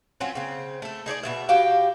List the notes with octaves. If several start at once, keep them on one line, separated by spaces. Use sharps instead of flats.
F#3 C4 C#4 F4
C#3 C4
A3 A4
D#4 G#4 C#5 D5
B2 F3 E5
F#4 G4 F5 G5